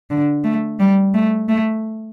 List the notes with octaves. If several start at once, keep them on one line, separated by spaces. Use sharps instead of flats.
D3
A3
G3
A3
A3